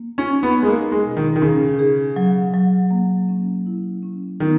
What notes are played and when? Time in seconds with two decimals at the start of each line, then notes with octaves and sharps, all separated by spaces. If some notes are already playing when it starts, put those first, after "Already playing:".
Already playing: A#3
0.18 C#4
0.30 D#4
0.43 B3
0.63 G#3
0.67 A#3 D#4
0.92 G#3
1.05 B2
1.17 D#3
1.36 D#3
1.42 C#3 G#4
1.79 G#4
2.16 F#3
2.54 F#3
2.91 A#3
3.29 C#4
3.66 E4
4.03 C#4
4.40 D#3 B3